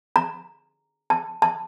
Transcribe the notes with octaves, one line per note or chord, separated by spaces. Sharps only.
A#5
A5
A5